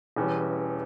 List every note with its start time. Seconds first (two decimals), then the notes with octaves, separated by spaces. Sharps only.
0.16 E1 E2 E3 G3 C#4